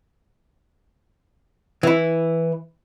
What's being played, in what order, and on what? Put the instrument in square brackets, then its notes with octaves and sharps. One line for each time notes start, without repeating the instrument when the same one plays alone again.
[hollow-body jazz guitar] E3 E4